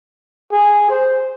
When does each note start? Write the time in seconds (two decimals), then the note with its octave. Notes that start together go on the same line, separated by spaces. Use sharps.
0.52 G#4
0.90 C5